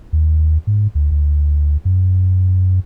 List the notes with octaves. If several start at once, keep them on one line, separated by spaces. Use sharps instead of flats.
D#2
G#2
D2
D2
F#2